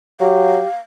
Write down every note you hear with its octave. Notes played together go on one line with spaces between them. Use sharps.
F#3 G4 F5